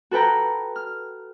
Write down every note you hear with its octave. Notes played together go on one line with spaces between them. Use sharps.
F#4 A4 B4 G5 A#5
F6